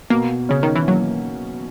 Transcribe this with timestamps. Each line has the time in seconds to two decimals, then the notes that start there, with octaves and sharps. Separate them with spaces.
0.10 B2 A#3
0.49 C#3 C#4
0.63 D#3
0.75 E3
0.87 F#3 A#3